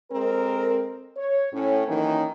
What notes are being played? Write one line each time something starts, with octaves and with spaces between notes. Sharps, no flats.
G#3 C4 A4 A#4
C#5
A2 C#4
D#3 E3 F#3 A#3 C#4 D#4